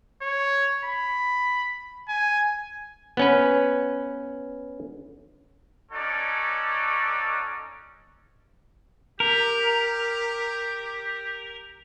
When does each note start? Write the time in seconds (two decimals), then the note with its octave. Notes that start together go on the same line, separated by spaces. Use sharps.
0.22 C#5
0.85 B5
2.09 G#5
3.17 B3 C#4 B4
5.92 C#4 D#4 F#4 A4 C#5 D5
9.20 G4 A#4